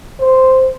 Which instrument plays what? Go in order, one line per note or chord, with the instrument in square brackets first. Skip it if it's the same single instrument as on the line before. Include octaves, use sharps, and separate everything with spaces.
[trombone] C5